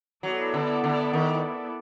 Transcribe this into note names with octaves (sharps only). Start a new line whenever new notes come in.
F#3 B3 E4 A4 D5
D3
D3
D#3